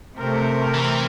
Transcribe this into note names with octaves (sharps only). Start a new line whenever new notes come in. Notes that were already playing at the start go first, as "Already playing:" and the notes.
C3 A3 A#4 C5
E3